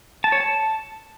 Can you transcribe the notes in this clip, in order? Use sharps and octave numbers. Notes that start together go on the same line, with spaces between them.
A5
C#5
A5